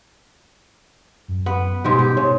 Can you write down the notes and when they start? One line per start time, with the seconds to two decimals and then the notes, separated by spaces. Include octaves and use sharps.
1.28 F#2
1.46 B3
1.84 G#2 B2 G#3 G4
1.99 G4
2.17 G#2 C#5